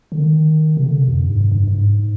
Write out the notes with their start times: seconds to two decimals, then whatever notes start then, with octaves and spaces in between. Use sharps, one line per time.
0.12 D3
0.20 D#3
0.77 C3
0.86 D3
0.97 C3
1.08 F2
1.19 G2
1.29 G#2
1.41 G2
1.52 G2
1.67 G2
1.76 G#2